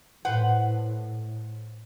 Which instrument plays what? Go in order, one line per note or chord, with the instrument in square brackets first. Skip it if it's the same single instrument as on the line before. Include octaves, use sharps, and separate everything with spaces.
[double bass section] A2 [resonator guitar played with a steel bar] B4 C5 F#5